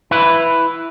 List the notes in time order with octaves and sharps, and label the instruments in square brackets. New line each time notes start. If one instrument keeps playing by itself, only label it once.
[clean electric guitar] E4 B4